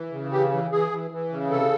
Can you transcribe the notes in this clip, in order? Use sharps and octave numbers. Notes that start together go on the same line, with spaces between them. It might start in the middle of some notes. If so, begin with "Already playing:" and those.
Already playing: E3
C#3
E3 G4
E3
E3 G#4
E3
E3
C#3
C3 A4